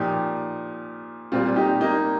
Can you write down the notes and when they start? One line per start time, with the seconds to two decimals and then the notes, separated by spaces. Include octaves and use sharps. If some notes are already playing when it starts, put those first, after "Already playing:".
Already playing: A#2 F3 D#4 G4
1.32 A#2 G3 C4 F4
1.56 D#4 G4
1.80 A#3 D#4